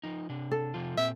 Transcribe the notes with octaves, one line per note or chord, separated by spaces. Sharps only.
F3 D#4
C3 D4
A4
C3 F3 F4
A#2 C4 E5